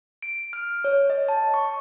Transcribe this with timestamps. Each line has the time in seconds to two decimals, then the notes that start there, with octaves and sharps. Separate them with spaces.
0.22 D7
0.53 F6
0.84 C#5
1.10 D#5
1.29 A5
1.54 C#6